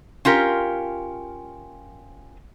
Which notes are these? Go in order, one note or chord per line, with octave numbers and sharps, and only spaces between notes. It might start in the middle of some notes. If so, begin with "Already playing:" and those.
C#4 F4 G4 A#4